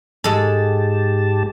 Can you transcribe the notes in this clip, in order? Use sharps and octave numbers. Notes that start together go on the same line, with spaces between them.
G#2 G#3 G4 A4 A5